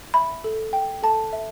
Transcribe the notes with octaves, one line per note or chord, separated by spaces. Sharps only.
E5 B5
A4
G5
A4 A5
E5